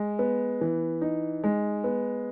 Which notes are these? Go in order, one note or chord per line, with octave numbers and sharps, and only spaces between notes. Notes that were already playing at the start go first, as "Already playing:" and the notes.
Already playing: G#3
B3
E3
D#4
G#3
B3